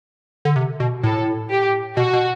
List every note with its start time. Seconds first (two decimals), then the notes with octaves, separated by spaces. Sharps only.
0.45 D3
0.56 C3
0.80 B2
1.03 A2 A4
1.50 G4
1.97 B2 F#4
2.13 B2